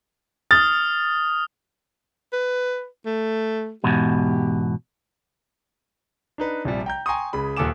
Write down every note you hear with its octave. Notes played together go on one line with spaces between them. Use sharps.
D#6 F6 A6
B4
A3
E2 G#2 B2 G4
D4 D#4 B4
A#1 C3 F3 G3
G5 A#5 G6
G5 G#5 A#5 C6 C#6 D#6
C#2 C#3 G#4 B5
D#1 D#2 A4 G#5 D6 E7